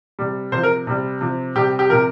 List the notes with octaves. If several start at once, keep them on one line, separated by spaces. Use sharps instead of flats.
C3 G3
C3 F3 C5
A#4
C3 G3
C3 F3
C3 G3 G4
G4
C3 F3 A#4